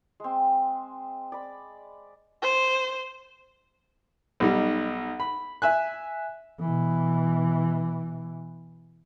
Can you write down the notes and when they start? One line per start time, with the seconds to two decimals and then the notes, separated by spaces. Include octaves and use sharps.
0.20 G#3 C4
1.32 D5 B5
2.42 C5
4.40 B1 G3 D#4
5.20 B5
5.62 E5 G#5 F#6
6.61 B2 E3